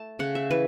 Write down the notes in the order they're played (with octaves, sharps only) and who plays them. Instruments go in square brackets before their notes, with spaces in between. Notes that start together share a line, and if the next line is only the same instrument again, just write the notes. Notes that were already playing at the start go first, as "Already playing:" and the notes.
Already playing: [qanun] A3 A5
C#3 F#5
E5
E3 B4